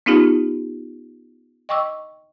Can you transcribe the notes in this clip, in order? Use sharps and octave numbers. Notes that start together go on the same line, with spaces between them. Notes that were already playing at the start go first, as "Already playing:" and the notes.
B3 C#4 D#4 F4 G4
D#5 G5 C#6 D6 E6